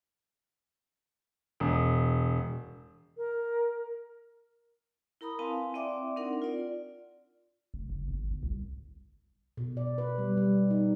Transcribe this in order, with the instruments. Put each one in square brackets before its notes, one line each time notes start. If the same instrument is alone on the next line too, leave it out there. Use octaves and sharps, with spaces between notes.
[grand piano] E1
[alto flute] A#4
[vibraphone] E4 A#4 A#5 B5 D#6
C4 E4 B4 F5 G#5 A5
C4 E4 D5 E5 G5 D6
C4 D4 D#4 A#4 F#5
F4 D5
[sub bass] F1
F#1
G1
G1
C2
[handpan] B2
D5
B4
G3
G3
D#4